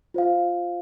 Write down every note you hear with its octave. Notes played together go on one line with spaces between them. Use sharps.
F4 C5 F5